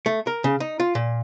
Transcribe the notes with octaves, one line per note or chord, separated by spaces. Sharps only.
A3
A#4
C#3
D#4
F4
A#2